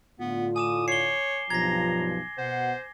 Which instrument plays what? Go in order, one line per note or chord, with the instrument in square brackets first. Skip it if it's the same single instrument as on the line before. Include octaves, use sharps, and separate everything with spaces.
[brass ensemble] A2 D3 F4 [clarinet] B3
[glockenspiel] G#5 D6 E7 [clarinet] D#6
[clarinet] C#5 [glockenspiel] C7 G7
[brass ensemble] B1 G2 F3 [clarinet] A#5 [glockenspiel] G#6 A#6
[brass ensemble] B2 F#5 [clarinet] C5